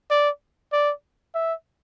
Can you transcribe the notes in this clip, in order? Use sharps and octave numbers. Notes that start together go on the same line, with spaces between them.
D5
D5
E5